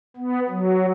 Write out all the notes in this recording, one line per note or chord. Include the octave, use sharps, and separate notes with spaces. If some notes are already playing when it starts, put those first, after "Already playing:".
B3
F#3